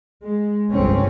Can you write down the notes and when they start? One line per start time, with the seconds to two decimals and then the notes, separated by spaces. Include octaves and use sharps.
0.25 G#3
0.71 G1 C2 F2 C#3 C4 C#4